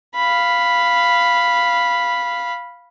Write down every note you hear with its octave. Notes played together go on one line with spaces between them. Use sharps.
F5 B5